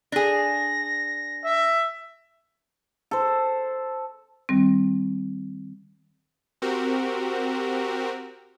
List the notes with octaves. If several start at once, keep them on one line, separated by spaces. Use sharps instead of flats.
D4 G#4 A#6
E5
A4 C5
D#3 G3 C4
C4 F#4 G4 A#4